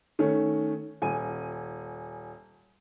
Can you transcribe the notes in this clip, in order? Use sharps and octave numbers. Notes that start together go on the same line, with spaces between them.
D#3 A3 C#4
D#1 G#5 D#7